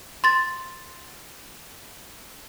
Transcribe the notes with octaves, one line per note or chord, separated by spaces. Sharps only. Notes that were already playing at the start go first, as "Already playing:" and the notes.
C6 A6